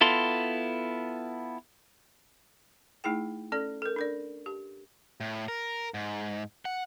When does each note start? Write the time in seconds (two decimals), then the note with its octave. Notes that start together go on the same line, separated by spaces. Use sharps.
0.01 B3 E4 F4 A4 C6
3.04 A3 D#4 E4 G#4 G5
3.52 C#4 A4 D5
3.82 A4 A#4
3.96 D4 A#4 D5
4.46 G4
5.20 A2
5.48 A#4
5.94 G#2
6.65 F#5